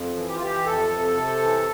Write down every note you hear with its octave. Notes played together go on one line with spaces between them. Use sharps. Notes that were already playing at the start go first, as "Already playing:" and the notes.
Already playing: F2
E3
G4
F4
E3 G4
F2 A4
C3
C3
E3